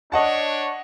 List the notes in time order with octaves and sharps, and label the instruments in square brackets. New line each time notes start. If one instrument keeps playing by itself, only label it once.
[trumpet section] D4 C#5 [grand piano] D#5 F#5 A5